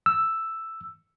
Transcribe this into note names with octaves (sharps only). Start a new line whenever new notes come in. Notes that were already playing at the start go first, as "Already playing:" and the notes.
E6